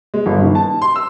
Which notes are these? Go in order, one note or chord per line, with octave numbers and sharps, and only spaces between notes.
G#3
G1
D#3
A5
C6
E6